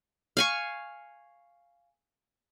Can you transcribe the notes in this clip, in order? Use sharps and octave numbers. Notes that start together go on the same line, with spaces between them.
F5 G#5 C#6